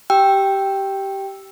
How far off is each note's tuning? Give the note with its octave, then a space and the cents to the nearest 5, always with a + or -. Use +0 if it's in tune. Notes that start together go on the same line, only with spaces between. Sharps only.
G4 -15 G5 +0 E6 +0